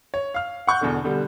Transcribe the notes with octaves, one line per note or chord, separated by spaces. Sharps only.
C#5
F5 F6
F#5 C#6 F#6 G6
E2 B2 D3
B2 D3 G3